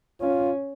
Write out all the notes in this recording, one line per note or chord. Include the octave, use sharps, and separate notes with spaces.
C#4 F4